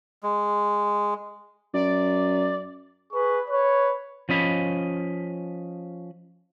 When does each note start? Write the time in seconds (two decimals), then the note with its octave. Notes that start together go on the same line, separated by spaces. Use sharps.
0.23 G#3
1.74 F#2 D5
3.12 G#4 B4 C#6
3.48 B4 C#5
4.29 F3 C#4 D#5 B5